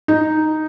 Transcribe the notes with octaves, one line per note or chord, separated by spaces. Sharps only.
D#4